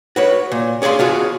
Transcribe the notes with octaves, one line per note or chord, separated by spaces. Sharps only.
F#4 B4 C#5
A#2
C#4 G#4 D5 F5 C6
B2 F4 F#4 G#4